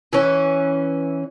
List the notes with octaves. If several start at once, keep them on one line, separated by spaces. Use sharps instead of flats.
E3 C#4